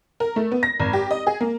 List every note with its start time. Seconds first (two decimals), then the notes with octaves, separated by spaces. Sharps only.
0.20 A#4
0.36 A3
0.52 B3
0.63 A#6
0.79 G#1
0.93 G4
1.11 D#5
1.27 G#4
1.41 A#3